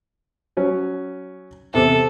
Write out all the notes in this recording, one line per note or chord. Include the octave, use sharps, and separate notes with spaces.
F#3 C#4
E2 C3 C4 A4